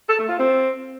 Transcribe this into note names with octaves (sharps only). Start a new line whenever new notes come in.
A4
A3
F4
C4